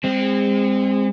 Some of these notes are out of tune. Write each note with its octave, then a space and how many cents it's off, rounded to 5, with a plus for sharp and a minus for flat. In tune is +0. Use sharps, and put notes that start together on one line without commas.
G#3 -35 C4 +0